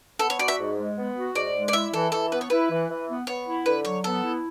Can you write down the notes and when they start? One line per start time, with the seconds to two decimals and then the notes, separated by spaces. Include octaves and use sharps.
0.19 B3 A4
0.30 C#5
0.39 F#4 D5
0.48 E5
0.59 G#2
0.78 G#3
0.97 B3
1.16 F#4
1.35 G#2 D5
1.54 G#3
1.68 D5
1.73 E4 E5
1.94 E3 A4
2.12 E3 A4
2.31 B3 B4
2.41 C#5
2.50 E4 B4
2.70 E3
2.89 E3
3.08 B3
3.27 B3 C#5
3.47 E4
3.66 D3 B4
3.85 F#3 C#5
4.04 B3 A4
4.24 E4